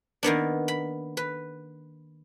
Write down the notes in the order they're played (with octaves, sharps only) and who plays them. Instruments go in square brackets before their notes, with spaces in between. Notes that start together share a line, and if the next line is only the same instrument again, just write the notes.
[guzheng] D#3 A#3 B3 D4
B5
B4